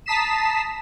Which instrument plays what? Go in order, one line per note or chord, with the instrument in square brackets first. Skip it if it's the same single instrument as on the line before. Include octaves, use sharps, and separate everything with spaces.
[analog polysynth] A5 A#5 D#6 B6 C7 E7